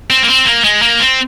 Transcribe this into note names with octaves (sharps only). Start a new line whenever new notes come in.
C4
A#3
C4
A#3
G#3
A#3
C4